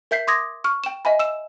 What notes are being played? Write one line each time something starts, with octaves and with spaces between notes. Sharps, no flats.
A#4 E5 G6 B6 C7
C6 D6 D#6 G#6 A#6
C#6 F6
G5 E7
D#5 E5 G#5 B5
E6 E7